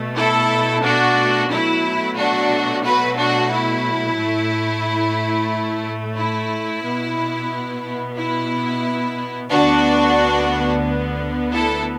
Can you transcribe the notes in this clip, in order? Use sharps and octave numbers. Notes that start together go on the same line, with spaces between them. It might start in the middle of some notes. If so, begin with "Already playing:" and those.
Already playing: B2 A3
E4 A4
D4 F#4
B2 F#3 A3 E4
D4 F#4
F#4 B4
D4 F#4
E4
A2 A3
E4
B2 B3
E4
D2 D3 B3 D4 F#4
E4 A4